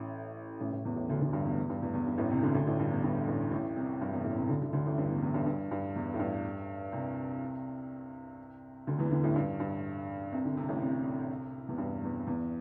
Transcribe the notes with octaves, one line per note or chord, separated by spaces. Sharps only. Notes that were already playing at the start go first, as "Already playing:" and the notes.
Already playing: A1 A2
A1 A2
A1 A2
E2
A1 A2
D2 D3
D2 D3
G2
E2
E2
G2
E2
E2
G2
A1 A2
C2 C3
D2 D3
D2 D3
A1 A2
G2
E2
G2
A1 A2
A1 A2
C2 C3
G2
E2
A1 A2
C2 C3
D2 D3
D2 D3
D2 D3
A1 A2
G2
E2
E2
G2
G2
G2
E2
A2
G2
C2 C3
D2 D3
E2 E3
D2 D3
A1 A2
G2
G2
C2 C3
D3
C2 C3
A1 A2
C2 C3
E2
G2
E2
E2